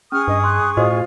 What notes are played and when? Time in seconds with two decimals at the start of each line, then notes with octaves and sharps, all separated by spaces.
0.12 C#4 G#4 C#6 D#6 F6
0.28 G2 D#5
0.44 C6 F#6
0.77 A2 F4 F#4 C5 D#5